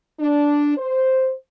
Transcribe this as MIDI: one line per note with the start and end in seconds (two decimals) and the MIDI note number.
0.20 0.76 62
0.77 1.32 72